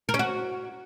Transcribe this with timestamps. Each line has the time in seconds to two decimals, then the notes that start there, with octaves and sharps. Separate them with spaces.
0.09 A#4
0.14 C#4
0.19 F#4